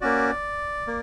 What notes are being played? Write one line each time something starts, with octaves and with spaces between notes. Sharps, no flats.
A#3 C#4 F#4 D5
A#3